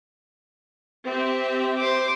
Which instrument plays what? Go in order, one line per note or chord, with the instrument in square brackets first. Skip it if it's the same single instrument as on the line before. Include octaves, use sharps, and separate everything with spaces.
[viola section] C4 G4 E5
[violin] C5 D6